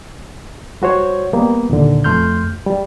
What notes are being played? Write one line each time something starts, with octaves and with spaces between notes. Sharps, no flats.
G3 F#4 C5 C#5
G3 A#3 B3
D#2 A#2 D3
F2 A3 C6 F6 G6
G3